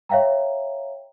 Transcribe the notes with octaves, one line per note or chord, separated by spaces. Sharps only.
C#5 E5 F5 G5 A#5